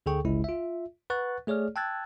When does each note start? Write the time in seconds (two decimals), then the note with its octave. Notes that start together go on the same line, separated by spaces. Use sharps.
0.06 D2 D3 G#4 A4 G5 C#6
0.25 G1 C#2 C#3 G#3 E4
0.44 F4 E5
1.10 B4 F#5 C#6 F#6 A6
1.47 A3 G#4 C#5 D5 F6
1.76 G5 A5 E6 F#6 G#6 A6